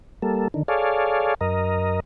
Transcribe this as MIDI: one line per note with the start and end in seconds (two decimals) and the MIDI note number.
0.22 0.48 55
0.22 0.48 58
0.22 0.48 69
0.54 0.63 50
0.54 0.63 51
0.68 1.34 68
0.68 1.34 69
0.68 1.34 73
0.68 1.34 74
0.68 1.34 77
1.41 2.00 42
1.41 2.00 70
1.41 2.00 75